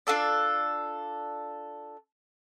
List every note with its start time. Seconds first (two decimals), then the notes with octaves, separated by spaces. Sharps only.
0.07 D4 F4 A4 D5